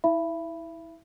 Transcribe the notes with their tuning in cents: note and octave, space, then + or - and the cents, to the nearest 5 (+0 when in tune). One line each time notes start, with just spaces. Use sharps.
E4 -25 E5 +30 B5 +0